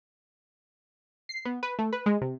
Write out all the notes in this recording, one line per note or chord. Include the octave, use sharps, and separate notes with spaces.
C7
B3
B4
A3
B4
G#3
C3